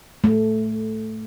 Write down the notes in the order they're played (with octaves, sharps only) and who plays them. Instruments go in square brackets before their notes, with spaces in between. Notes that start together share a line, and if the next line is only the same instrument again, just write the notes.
[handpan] A3